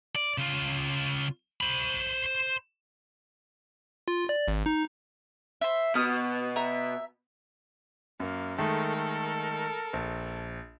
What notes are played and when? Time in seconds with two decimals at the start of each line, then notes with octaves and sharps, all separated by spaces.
0.16 D5
0.38 C#3 F4
1.61 C5 B5
4.08 F4
4.29 D5
4.48 G#1
4.66 D#4
5.61 C5 E5
5.95 B2 D#6 F6
6.56 E5 A#5
8.20 F#2 A#3
8.58 D#3 G#3 A3 A4 A#4
9.93 A#1